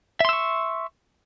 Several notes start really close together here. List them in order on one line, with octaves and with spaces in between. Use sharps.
E5 C6 E6 C#6